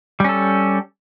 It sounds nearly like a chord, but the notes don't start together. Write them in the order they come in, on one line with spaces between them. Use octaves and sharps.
G3 C#4 A4